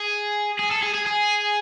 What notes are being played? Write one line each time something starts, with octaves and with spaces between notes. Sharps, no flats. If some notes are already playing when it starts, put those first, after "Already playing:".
Already playing: G#4
G#4
A4
G#4
G#4
G#4